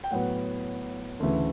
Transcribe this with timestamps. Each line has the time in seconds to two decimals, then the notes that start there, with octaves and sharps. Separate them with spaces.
0.04 G5
0.11 A2 F#3 B3 F#5
1.20 D2 C#3 E3 A3